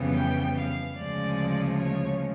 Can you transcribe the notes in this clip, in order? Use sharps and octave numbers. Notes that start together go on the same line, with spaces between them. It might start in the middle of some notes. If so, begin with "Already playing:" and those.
Already playing: F2 C#3 E3 G3 B3
G5
F5
D2 C#3 F3 G#3 D5
C#5